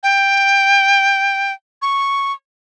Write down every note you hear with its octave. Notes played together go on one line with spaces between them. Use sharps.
G5
C#6